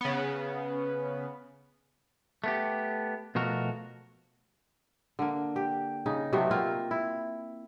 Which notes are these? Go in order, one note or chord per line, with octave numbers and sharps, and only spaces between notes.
C#3 B3
A3 B3 G4
B2 F3 A3 F#4 A#4
D3 A#3
G4
C#3 D#4
C3 F#3 A3 B3
A#3 C4 F4
E4